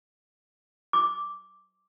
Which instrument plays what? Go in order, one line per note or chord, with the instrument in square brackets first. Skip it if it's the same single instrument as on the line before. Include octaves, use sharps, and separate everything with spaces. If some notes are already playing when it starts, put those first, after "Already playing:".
[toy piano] D6